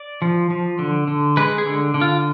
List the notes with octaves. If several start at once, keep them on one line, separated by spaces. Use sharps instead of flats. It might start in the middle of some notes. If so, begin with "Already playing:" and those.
Already playing: D5
F3
F3
D3
D3
G#3 B4
G#4
D3
D3
F4